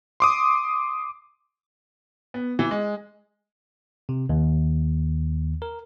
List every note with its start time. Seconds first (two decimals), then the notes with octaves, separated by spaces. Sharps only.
0.20 C6 D6 D#6
2.34 B3
2.59 E3
2.71 G#3
4.09 C3
4.29 D#2
5.62 A#4